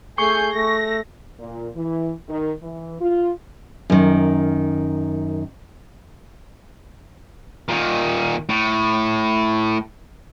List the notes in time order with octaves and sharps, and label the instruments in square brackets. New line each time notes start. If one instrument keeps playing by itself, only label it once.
[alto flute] A3 [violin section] G#4 G6 C7 [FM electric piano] C#6
[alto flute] A3 [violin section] A#6
[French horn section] A#2
E3
D#3
E3
F4
[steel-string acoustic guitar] F#2 D#3
[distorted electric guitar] A#2 D#3
A2